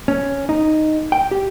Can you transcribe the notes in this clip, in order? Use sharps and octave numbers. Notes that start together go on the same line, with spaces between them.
C#4
D#4
G5
G4